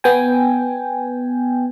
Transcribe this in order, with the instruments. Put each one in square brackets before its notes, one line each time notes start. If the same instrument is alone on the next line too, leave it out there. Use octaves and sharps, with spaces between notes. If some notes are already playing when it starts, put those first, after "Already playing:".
[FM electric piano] B3 G5 G#5